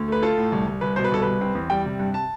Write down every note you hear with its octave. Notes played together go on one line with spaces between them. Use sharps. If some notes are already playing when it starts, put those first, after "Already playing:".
Already playing: D2
A3 B4
F4 A4
A2
C2
C2
C2 B4
B2 C5
B4
C2 A4
C2 B4
C4
E2
G3 G5
C3
G2
A5